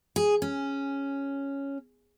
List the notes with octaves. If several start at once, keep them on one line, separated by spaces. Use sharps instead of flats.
G#4
C#4